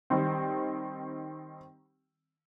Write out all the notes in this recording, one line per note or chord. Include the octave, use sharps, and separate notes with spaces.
D#3 G3 C4